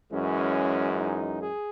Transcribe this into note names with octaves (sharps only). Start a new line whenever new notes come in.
F#2 E3 G#3 C#4
D#4
G#4